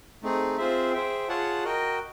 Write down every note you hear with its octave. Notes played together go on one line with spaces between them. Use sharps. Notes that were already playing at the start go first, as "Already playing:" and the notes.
A3 C4 D#4 G#4
C4 F4 G#4 C5 E5
G#4 C5 E5 G5
F4 G#4 C#5 F#5 A5
F#4 A#4 D#5 G5